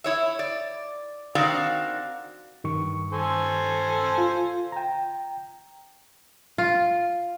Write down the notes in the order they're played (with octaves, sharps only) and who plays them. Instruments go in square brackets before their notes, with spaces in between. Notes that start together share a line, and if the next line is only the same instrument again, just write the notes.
[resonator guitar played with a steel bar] E4 C#5 E5
D5
D#3 C4 D4 F#4 D5 F5
[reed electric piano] G2 D#3 C#6
[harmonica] A4 C5 G#5
[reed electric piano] F4
G5 A#5
[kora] F4